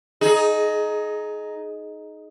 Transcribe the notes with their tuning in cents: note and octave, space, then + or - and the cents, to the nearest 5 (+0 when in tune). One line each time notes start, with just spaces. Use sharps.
D#4 +0 G#4 +25